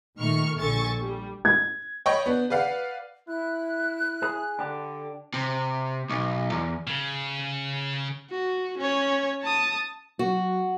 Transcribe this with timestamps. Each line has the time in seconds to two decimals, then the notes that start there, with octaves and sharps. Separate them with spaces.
0.18 A#2 D#3 A3 C#6 F6
0.60 A#1 D3 A4 G#5 C#6 A6
1.00 G3
1.45 G#6
2.06 C#5 D#5 G5 B5 C#6 G6
2.26 B3 D4
2.50 B4 D5 F5 F#5
3.28 E4 F#6
4.22 G#4
4.59 D3 D4 G4
5.34 C3
6.10 B1
6.52 E2
6.87 C#3
8.31 F#4
8.78 C#4 C#5
9.43 A5 D#6
10.19 F#3 F#4